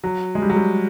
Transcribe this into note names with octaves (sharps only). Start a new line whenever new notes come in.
F#3
G#3
G3
F#3
G3